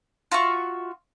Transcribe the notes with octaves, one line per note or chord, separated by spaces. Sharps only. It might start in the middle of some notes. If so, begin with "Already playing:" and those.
F4 F#4 E5 C#6